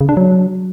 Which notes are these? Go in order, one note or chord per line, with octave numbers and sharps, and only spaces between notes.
C#3
D4
F#3